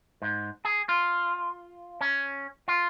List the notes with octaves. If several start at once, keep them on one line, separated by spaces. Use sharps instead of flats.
G#2
G#4
F4
C#4
F4